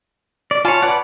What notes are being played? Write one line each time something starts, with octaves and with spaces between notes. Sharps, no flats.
D5
F4 C#5 G#5 A5 B5
B4 D5 F#5